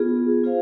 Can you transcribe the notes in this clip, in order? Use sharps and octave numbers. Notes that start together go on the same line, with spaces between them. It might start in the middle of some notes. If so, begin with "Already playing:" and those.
Already playing: B3 F4 G#4
F4 G#4 C5 F5